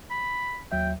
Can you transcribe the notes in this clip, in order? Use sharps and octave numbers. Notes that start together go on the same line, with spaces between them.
B5
D#2 F#3 E5 G5